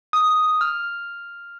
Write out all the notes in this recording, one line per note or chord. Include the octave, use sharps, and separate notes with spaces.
D#6
F6